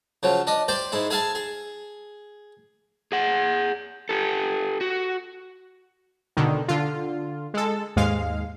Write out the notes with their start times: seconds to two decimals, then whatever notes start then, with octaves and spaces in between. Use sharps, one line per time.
0.23 C#3 F3 F#3
0.47 D4 D#5
0.68 G4 C5 D5
0.92 G#2 G#3 E4
1.10 G#4 E5 F5 G#5 A5
1.35 G#4
3.12 G#4 F#5
4.09 G4 A4
4.81 F#4
6.37 B2 D3 D#3
6.68 D3 F4
7.54 G#3 A4
7.96 D#2 G#2 G#3 F5